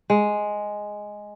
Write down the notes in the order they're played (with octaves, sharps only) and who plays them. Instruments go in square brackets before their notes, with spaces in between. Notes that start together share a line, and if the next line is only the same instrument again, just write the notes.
[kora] G#3